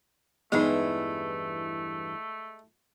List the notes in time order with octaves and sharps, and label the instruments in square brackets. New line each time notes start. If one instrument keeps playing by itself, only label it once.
[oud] E2 G2 E3 [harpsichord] G#3 [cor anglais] A3 [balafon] B3 D#4